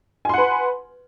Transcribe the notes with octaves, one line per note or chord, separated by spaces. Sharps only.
B4 F#5 G#5 C6